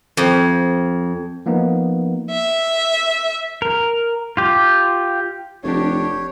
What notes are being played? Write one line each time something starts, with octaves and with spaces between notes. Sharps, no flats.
F2
F3 A#3 B3 D#4
E5
A#4
F4 G4
F1 D4 G4 C#5